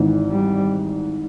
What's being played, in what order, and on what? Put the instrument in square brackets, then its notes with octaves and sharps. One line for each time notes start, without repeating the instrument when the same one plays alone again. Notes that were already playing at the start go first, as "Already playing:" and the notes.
Already playing: [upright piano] G#1 G#2 E3
[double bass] G3